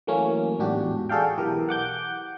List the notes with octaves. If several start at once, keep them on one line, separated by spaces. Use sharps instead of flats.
E3 F#3 A3 A#3 C#4
A1 E2 G#2 D4 F#4 G4
F#4 G#4 A4 D5 F5 G5
B1 E3 G4 A#4
F#5 D6 G6